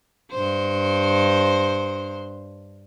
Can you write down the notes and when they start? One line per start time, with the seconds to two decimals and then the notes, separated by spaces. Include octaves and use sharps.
0.32 G2 C5